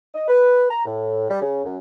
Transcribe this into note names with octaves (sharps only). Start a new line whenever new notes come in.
D#5
B4
A#5
A2
G3
C#3
F#2